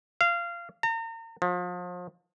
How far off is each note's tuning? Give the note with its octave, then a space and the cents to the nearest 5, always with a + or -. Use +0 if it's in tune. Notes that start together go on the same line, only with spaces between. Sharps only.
F5 -20
A#5 -40
F3 +35